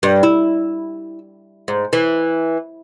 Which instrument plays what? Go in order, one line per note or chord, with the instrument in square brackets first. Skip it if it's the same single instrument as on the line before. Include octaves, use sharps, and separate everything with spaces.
[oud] G2
E4
G#2
E3